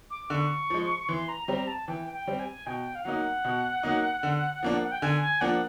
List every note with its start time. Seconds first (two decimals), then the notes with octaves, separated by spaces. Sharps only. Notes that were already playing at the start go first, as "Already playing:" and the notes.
0.10 D6
0.30 D3 C#6
0.70 F3 G#3
1.09 E3 C6
1.29 A#5
1.48 G3 C4 A#5
1.59 A#5
1.67 A5
1.88 E3 G5
2.13 G5
2.27 G3 C4
2.40 G#5
2.66 B2 G5
2.95 F5
3.05 F#3 A#3 D#4 F#5
3.45 B2
3.83 F#3 A#3 D#4
4.23 D3
4.63 F3 A#3 D4
4.83 F#5
4.92 G5
5.02 D3 G#5
5.21 G#5
5.41 F3 A#3 D4 F#5